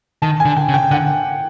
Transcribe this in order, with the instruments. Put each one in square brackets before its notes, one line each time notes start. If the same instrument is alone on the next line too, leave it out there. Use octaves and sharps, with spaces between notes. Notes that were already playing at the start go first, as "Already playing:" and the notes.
[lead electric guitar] D#3 [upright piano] A5
[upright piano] G#5
[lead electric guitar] D3
[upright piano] G5
[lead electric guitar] C#3
[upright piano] G5
[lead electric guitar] D3 [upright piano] F#5